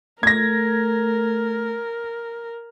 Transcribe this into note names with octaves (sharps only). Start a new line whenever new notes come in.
A3 A#4 G#6 A#6